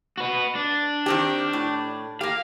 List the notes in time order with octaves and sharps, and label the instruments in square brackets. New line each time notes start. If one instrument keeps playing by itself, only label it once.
[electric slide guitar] F#4 B4
D4
[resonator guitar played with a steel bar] D#3 C4 G4
A2
[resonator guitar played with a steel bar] A#3 G4 [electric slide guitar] F5